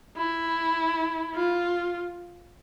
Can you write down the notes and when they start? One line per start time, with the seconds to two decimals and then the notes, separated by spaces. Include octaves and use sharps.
0.17 E4
1.35 F4